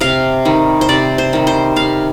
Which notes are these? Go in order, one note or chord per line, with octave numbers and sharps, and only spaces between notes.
C3 F5
D#3 G3
C5
C3 D5
C5
D#3 G3
C5
C3 F5